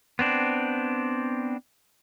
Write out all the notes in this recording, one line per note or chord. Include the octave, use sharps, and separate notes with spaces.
B3 C4 D4